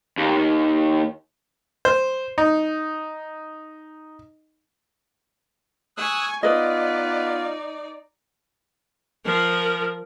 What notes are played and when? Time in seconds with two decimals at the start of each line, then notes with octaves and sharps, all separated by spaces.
0.17 D#2
1.85 C5
2.38 D#4
5.97 G#5 C#6 D#6 E6 F#6
6.43 B3 D#4 F4 B4 D5 D#5
9.25 F3 A#4